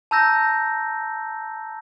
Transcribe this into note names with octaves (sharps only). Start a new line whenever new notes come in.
A5 A#5 E6 G6 A#6